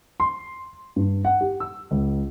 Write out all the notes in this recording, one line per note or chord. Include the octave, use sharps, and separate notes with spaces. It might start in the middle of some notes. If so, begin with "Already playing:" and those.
C6
G2
F#5
G4
E6
C#2